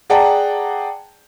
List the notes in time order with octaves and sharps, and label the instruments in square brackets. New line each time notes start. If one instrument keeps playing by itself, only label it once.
[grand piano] G#4 D5 F#5 G5 A5 A#5